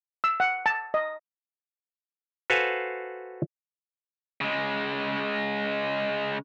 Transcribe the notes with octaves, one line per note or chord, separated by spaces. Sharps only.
E6
F#5
A5
D#5
F#4 A4 B4 C5 F5 G#5
C#3 G#3